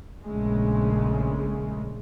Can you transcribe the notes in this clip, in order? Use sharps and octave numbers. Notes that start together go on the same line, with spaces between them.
A#1 C#3 G#3 A3